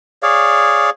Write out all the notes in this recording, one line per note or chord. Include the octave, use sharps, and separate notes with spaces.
G#4 C#5 D5 F5